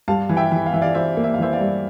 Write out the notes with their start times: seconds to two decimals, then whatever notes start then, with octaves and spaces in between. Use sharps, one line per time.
0.08 G2 F5 A5
0.29 E3
0.37 E5 G5
0.52 E3
0.66 F5
0.73 E3 E5
0.82 D5 F5
0.94 E3 C5 E5
1.17 A#3
1.24 E5
1.34 F5
1.39 E3 C5 E5
1.53 D5 F5
1.61 G2